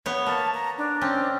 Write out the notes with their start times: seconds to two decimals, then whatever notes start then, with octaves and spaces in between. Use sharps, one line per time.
0.06 B3 C#5
0.26 A#3 A5
0.54 A#5
0.78 D4
1.01 C4 C#4